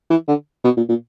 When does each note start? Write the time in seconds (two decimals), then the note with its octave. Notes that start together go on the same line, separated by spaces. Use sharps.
0.10 E3
0.28 D3
0.64 B2
0.77 A#2
0.89 A#2